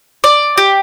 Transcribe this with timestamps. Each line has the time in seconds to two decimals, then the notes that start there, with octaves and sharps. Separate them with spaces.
0.24 D5
0.58 G4